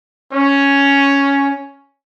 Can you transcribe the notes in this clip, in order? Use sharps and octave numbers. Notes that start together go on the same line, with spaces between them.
C#4